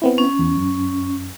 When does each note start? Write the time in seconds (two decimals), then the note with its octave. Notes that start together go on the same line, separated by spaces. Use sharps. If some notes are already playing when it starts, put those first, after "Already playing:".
0.02 B3 C4 E4
0.18 C#4
0.39 E2
0.57 F#2